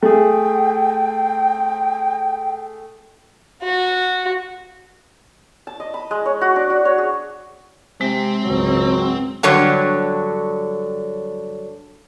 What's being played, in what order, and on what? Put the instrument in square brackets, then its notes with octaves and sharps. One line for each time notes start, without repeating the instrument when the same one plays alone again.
[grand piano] A3 G#4 [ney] G5
[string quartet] F#4
[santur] A5
D#5
B5
G#3
C#5
F#4
D4
F#4
C#5
G#4
[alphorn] C3 [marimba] G#3 [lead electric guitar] C4
[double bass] G#1 C#2 [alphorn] F#3
[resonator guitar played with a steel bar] G2 D3 F#3 C#5